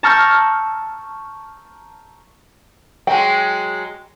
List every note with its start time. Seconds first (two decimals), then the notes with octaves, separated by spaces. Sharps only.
0.03 A5 A#5 C#6 E6 F6 G6
3.07 F#3 G#3 G5